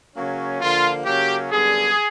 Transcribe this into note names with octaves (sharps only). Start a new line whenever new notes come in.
C#3 F#3 A#3 C#4
D3 F3 A#3 F4
C#3 F#3 A#3 C#4 G4
F#2 D3 G3 B3 G#4